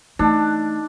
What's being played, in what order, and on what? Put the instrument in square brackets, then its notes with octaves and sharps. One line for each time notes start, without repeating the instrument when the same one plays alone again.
[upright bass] E3 A3 [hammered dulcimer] D4 [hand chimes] D#4